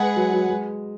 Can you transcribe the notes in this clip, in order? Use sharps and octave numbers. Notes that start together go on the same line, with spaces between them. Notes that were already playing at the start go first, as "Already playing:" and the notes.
Already playing: G#3 G#4 B4 F#5
F#3
F#3
G#3